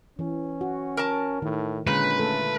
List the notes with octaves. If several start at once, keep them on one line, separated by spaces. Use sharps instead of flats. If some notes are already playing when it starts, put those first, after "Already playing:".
E3 C#4
F#4
A#4 A5
A2 D#3
A#2 D3 G#3 C#4 B4
A3 A4